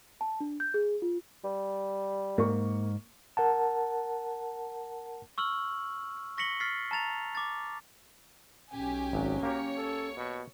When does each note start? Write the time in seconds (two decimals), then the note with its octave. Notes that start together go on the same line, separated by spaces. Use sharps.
0.21 A5
0.40 D4
0.60 G6
0.74 G#4
1.02 F4
1.44 G3
2.38 G#2 A#3 C#6
3.37 A#4 F#5 A5
5.38 C#6 E6 F6 F#7
6.38 C#6 A#6 B6 C#7 F#7 G7
6.60 F6 A6 B6 C7
6.91 A5 A#5 A6 F7
7.35 D6 A6
8.72 B1 C#4 G4 G#5
9.13 G#1 F#3
9.43 A#3 G4 A#4 C#5
9.77 A4
10.17 B2